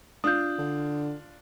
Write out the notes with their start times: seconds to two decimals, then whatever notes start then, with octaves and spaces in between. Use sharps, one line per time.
0.24 D4 F4 D#6 G6
0.58 D3